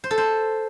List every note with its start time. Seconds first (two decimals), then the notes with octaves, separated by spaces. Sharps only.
0.04 C5
0.11 A4
0.18 C5